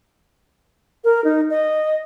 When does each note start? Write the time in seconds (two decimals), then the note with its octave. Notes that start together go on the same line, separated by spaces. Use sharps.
1.04 A#4
1.24 D#4
1.50 D#5